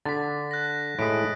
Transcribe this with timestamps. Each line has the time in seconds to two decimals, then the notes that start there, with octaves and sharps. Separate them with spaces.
0.05 D3 A6 B6
0.51 F#6 A#6
0.99 A2 G#3 D#6 B6 D7